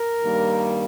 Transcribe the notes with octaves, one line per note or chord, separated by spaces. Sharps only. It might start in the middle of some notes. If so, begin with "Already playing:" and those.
Already playing: A#4
G2 D#3 G3 A#3